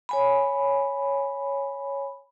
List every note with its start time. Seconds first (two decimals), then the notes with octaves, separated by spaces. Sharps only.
0.09 C#5 G#5 B5